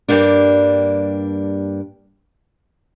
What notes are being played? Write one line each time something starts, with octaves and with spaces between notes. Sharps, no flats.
G2 G3 A#3 D4